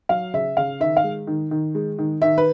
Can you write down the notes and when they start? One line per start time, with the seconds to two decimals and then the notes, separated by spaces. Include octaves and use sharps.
0.09 F#3 F5
0.34 C#3 E5
0.57 C#3 F5
0.80 D#3 E5
0.97 F5
1.04 G#3
1.27 D#3
1.51 D#3
1.75 G#3
1.98 D#3
2.22 D#3 E5
2.38 B4